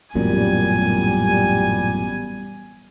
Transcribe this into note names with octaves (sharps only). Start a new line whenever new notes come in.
A1 F#2 A#2 G3 B3 G#5